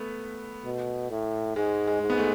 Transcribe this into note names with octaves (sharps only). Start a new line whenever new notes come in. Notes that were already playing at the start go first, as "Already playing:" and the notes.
Already playing: A3 B3
B2
A2
G#2 G#3
G#3
G#2
B3
A3